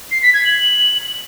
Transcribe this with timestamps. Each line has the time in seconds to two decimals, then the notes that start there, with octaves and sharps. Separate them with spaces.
0.11 C7
0.22 B6
0.34 G#6
0.45 F#7